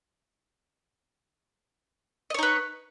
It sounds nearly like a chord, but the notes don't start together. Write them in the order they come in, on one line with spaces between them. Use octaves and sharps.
D#5 C#5 D#4 B4